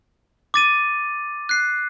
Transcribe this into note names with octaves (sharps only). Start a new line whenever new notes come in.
D6 A6 D#7
F#6 C7